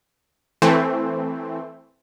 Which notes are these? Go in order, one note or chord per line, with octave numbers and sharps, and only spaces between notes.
E3 A3 C4